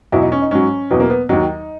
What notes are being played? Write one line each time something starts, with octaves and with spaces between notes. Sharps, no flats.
E2 B2 F#3 E4
D#4
C#4
D#4
G#2 F#3 C#4
E2 B2 F#3 B3
A#3
B3
D#2 D#3 F#3 D#4